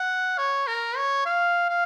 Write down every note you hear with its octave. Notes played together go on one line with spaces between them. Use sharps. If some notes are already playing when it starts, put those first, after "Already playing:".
Already playing: F#5
C#5
A#4
C#5
F5
F5